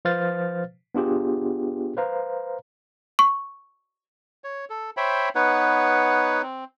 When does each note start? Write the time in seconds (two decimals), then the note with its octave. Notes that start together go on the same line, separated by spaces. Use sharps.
0.05 F3 B4 C5 F5 F6 A6
0.95 B3 D4 F4 G4 G#4
1.97 B4 C5 F5 A#5
3.19 C#6
4.44 C#5
4.70 A4
4.97 C5 C#5 E5 G5 B5
5.35 B3 D#4 B4 C#5 F#5
6.43 C4